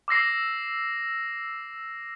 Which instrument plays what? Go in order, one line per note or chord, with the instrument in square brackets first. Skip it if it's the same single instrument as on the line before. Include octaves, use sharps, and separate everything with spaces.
[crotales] D6 E6 A#6 C7